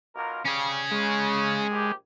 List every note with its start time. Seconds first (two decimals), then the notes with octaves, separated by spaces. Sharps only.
0.16 B1 F4 A#4
0.45 C#3 G3 C#4 G#4
0.91 C#3 G#3
1.71 A#1 G4